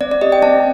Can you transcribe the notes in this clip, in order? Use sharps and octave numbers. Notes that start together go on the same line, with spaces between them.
C4 D5
D5
G4 D#5
G5
C4 A5